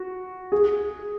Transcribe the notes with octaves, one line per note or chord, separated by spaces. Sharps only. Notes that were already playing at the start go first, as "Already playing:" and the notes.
Already playing: F#4
G#4